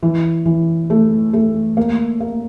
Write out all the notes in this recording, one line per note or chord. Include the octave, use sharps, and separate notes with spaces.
E3
E3
A3
A3
A#3
A#3